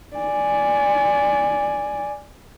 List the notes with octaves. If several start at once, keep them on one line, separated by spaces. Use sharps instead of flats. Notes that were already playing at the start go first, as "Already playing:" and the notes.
D5 G#5